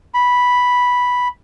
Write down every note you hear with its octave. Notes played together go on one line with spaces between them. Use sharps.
B5